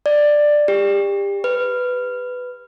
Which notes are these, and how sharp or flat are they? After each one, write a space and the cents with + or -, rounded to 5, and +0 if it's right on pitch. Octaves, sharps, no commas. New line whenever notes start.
D5 +10
G4 +30
B4 +10